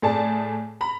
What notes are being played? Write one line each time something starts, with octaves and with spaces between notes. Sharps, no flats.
A2 A3 G#4 D5 A5
A#5 B5